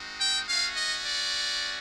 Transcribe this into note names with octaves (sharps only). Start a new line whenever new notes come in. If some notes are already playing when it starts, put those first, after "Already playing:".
Already playing: G#3 C4 D#4 F#4
G5
A3 C#4 F#4 F5
D#5
D5